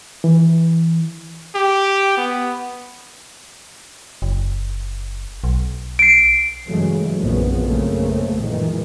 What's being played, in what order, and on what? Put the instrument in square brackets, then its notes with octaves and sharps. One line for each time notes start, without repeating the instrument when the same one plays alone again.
[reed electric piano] E3
[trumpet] G4
B3
[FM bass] F#1
B1
[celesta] C7 D7
[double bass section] G2 C#3 E3 F#3 G#3 A3
A#1 F#2 C#3 F#3 B3 C4
B1 F#2 C#3 A3 A#3 C4
F#2 A#2 D#3 E3 G#3